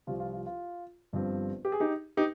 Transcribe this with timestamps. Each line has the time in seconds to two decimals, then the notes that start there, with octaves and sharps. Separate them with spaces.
0.07 C2 C3 F3 F4
0.20 F4
0.33 F4
0.46 F4
1.13 G1 G2 F3 C4
1.65 G4
1.72 G#4
1.80 D#4 G4
2.17 D#4 G4